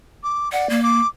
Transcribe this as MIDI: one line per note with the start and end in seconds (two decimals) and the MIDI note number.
0.23 0.49 86
0.52 0.80 74
0.52 0.67 78
0.70 1.00 58
0.83 1.07 86